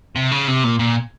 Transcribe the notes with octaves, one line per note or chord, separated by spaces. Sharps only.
C3
C#3
C3
A#2
A#2